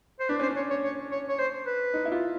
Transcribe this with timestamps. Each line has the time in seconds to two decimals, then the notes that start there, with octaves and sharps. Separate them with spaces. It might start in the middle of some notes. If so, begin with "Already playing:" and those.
0.20 C5
0.29 D4 B4
0.39 C#4 C5
0.49 D4
0.57 C#5
0.70 C#5
0.84 C#5
1.11 C#5
1.29 C#5
1.39 C5
1.66 B4
1.94 D#4
2.05 E4
2.12 F4